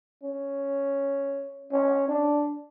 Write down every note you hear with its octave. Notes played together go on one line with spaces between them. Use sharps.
C#4
C#4
D4